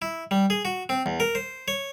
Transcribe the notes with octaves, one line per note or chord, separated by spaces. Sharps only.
E4
G3
G#4
F#4
C4
E2
A#4
C5
C#5